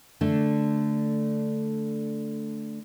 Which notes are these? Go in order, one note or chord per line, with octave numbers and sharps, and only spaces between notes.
D3 A3 D4